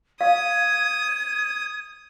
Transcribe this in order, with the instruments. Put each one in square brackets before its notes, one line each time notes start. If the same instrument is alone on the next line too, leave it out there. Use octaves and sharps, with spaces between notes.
[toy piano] F5 [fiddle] D#6 [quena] G#6